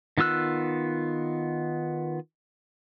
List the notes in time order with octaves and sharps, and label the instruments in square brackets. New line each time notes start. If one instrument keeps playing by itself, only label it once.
[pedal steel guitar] D#3 B3 F4 E6 F#6